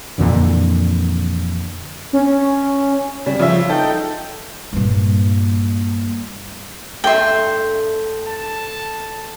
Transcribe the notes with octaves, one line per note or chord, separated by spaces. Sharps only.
F2 A#2 D3 E3
C#4
C#3 G3
C#3 F3 E5
D#4 A4 G5
G2 A#2
G2 A3 A4 E5 G5 C6
A5